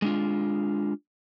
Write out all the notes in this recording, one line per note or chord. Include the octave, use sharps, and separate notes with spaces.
G#3 D4 F4